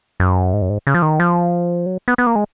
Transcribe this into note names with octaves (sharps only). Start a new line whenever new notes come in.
F#2
G#2
F#2
G#2
C#3
F3
D#3
F3
F#3
B3
B3
A#3
G#3